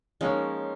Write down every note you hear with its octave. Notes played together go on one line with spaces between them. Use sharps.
F3 G#3 A#3 C#4 D#4 C#5